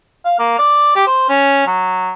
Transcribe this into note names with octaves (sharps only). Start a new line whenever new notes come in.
F5
A#3
D5
G4
C5
C#4
F#3